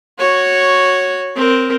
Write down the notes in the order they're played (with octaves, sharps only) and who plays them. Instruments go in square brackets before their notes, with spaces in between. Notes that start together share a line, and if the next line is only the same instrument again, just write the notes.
[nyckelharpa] F#4 C#5
C4 A#4